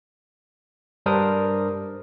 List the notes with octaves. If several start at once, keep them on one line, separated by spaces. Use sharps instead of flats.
G2 G3 D4 A#4 C5 D#6